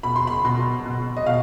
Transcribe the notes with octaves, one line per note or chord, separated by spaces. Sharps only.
B2 B5
C6
B5
B2 C6
B2
D#5
B2 F5